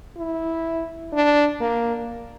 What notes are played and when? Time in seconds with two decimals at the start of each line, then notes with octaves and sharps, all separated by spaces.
0.18 E4
1.13 D4
1.60 A#3